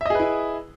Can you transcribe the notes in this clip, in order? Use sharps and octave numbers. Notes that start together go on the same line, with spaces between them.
E4 G#4 B4 D#5 E5